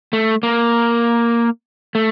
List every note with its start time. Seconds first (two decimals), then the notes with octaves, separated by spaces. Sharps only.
0.13 A3
0.43 A#3
1.95 A3